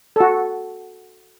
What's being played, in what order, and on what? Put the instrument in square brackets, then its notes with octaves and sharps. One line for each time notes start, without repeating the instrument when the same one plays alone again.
[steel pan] F#4 A4